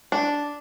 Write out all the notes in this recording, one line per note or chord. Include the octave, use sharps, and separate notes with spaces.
D4